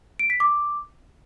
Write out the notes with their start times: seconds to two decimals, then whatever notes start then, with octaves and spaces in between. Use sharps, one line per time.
0.19 D7
0.30 B6
0.40 D6